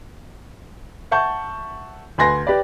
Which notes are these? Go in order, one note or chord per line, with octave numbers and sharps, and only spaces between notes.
E5 F#5 A5 C#6 G6
D2 B4 G#5 C6 A#6
G4 B4 D5